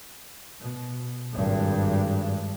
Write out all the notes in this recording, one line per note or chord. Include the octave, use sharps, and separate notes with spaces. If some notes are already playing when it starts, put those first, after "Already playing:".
B2
G#1 G2